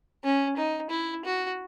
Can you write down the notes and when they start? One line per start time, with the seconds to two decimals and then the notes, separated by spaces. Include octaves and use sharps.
0.24 C#4
0.57 D#4
0.90 E4
1.25 F#4